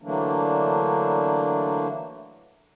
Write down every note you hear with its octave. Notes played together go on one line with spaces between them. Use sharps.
D3 E3 F#3 A3 A#3 D4